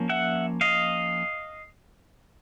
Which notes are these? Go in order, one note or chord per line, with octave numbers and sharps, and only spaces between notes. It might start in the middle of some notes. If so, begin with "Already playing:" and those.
Already playing: F3 A#3 C#4
E5 F#5
D#5 F5